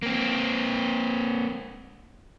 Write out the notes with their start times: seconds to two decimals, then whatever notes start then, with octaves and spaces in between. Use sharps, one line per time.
0.03 A#3 C4